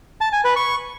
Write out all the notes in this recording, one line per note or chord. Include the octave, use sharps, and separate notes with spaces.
A5
G#5
B4
C#6